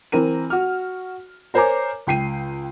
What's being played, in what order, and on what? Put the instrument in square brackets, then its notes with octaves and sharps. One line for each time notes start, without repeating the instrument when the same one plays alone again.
[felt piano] E3 C4 A#4 D#7
F#4 F6
A#4 C5 C#5 G#5 A#5 D6
C#2 G5 C7 D#7